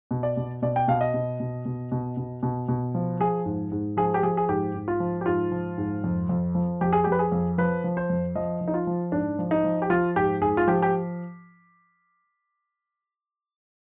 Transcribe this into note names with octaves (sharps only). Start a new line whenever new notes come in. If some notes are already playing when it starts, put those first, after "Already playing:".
B2
D5
B2
B2 D5
G5
B2 F5
D#5
B2
B2
B2
B2
B2
B2
B2
F3
F3 G#4
G#2
G#2
F3 G#4
G4
F3 G#4
G#4
G#2 G4
G#2
F4
F3
G4
G#2 F4
F3
G#2
F2
F2
F3
F2 G4
G#4
F2 G4
B4
G#4
F2
F3 B4
F3
C5
F2
F3 D#5
F3
D#4
F4
F3
G#2 D4
F3
D#4
F3
G4
F3 F4
G#2 G4
G#2 G#4
F4
F3 G4
G4